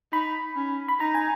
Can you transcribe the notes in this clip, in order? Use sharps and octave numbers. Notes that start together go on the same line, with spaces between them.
D#4 B5
C#4
B5
D#4 A#5
G#5